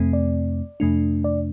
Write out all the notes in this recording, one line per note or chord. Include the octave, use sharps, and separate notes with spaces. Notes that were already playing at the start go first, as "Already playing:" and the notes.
Already playing: F2 C3 A3 C4
D5
F2 C3 A3 D4
D5